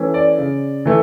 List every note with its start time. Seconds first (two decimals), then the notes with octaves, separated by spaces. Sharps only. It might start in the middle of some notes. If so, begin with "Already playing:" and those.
Already playing: E3 A3 C#4
0.14 D5
0.38 C#3
0.85 E3 A3